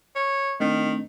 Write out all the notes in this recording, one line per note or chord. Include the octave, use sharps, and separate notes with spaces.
C#5
D#3 A3 C4 D4